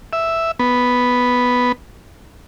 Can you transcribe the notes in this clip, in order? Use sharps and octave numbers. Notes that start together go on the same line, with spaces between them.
E5
B3